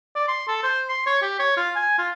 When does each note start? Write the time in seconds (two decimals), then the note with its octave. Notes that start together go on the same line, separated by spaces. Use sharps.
0.15 D5
0.28 C6
0.48 A4
0.63 C5
0.89 C6
1.06 C#5
1.22 G4
1.39 C#5
1.57 F4
1.76 G#5
1.98 F4